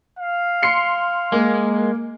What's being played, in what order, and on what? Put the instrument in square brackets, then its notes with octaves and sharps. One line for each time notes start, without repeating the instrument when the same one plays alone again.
[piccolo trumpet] F5
[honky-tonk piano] C6 C7 C#7
[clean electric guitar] G#3 [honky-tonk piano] A#3